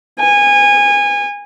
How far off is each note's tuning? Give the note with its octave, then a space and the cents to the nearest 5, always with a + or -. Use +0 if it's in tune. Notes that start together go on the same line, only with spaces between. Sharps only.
G#5 -25